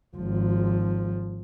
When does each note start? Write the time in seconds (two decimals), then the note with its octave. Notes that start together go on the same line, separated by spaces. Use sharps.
0.16 G#1 F3